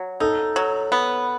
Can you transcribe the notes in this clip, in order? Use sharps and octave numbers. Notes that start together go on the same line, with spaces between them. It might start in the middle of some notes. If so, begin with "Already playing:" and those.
Already playing: F#3
D#4 A4
F#3
B3